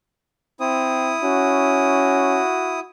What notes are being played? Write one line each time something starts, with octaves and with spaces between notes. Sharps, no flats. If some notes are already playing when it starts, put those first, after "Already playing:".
C4 E4 D#6
C#4 F#4